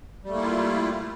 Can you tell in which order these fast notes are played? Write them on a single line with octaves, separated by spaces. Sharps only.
G3 A3 A#3 E4 F4